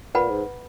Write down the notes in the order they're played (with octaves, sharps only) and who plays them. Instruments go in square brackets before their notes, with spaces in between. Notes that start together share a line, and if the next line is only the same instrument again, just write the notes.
[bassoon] A#2 [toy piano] B4 F#5 B5
[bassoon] G#2